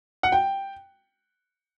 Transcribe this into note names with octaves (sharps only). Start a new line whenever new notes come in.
F#5
G5